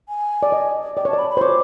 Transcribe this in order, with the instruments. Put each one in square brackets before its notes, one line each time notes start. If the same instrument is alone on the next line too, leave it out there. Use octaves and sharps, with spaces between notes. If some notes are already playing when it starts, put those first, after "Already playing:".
[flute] G#5
[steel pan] D5
D#5
[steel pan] D5 [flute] G5
[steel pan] C#5 [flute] A5
[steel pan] D5
[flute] B5
B5
[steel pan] C5
[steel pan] C#5 [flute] D6